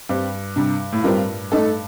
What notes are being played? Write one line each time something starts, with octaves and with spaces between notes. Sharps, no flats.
G2 G3 C4 G4
C3 G3 D4
A2
G2 G3 C4 F4 A#4
A3 D#4 A4